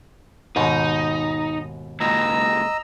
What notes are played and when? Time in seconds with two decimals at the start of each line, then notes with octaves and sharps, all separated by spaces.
0.56 D#2 G#2 B2 D#4
2.00 C#2 A#2 D#5 A#5 E6